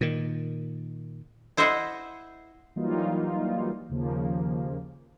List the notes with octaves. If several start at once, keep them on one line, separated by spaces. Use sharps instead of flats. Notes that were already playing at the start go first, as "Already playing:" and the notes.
A#2 D#3
E4 C5 D#5 E5 F#5
E3 F#3 G3 A#3 D#4 F4
D#2 C#3 F3 A#3